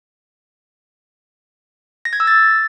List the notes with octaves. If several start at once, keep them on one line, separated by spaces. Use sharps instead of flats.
A#6
G#6
E6
A6